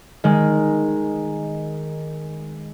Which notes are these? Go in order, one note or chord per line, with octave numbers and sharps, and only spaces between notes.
D#3 G#3